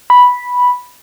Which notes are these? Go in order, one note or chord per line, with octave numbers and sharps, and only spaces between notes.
B5